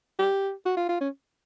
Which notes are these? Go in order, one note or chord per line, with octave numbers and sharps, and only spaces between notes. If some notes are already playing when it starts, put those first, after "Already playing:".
G4
F#4
F4
F4
C#4